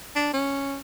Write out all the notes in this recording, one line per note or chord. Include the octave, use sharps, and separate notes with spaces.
D4
C#4